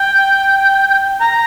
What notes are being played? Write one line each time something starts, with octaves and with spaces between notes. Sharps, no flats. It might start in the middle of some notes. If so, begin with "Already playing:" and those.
Already playing: G5
A#5